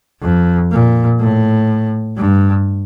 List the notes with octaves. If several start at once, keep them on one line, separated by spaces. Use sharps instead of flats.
F2
A#2
A2
G2